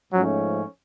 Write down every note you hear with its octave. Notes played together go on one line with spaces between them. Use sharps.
G#2 F3 F#3 A3 C#4